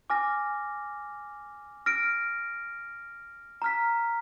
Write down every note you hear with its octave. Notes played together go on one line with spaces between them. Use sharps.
G#5 D6 F6 A#6
F6 A#6 D7
A#5 F6 B6